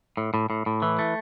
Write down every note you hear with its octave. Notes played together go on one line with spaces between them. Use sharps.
A2
A2
A2
A2
E3
A3